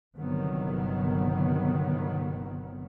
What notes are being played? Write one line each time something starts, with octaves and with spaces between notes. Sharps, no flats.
G1 C3 D#3 F#3 B3